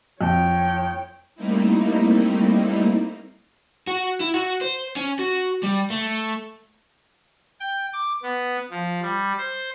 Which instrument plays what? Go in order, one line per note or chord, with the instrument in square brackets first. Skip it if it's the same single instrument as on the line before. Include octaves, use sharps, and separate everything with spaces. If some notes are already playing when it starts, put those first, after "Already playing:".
[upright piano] F2 [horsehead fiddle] C#5 G5
[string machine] G3 A3 A#3 C4 D#4 E4
[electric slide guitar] F#4
E4
F#4
C5
C#4
F#4
G3
A3
[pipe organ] G5
D6
B3
F3
G3
C5